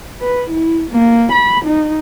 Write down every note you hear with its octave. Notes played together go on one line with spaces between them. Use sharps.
B4
E4
A#3
B5
D#4